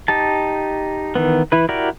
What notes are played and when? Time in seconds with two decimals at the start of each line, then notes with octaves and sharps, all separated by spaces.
0.08 D#4 G4 A5
1.15 D#3 E3 B3
1.52 E3 E4 B4
1.69 E4 F#4 G4 A#4 D5